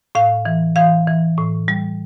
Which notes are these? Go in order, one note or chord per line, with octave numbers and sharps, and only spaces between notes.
A2 F5
E3
E3 F5
E3
A2
G3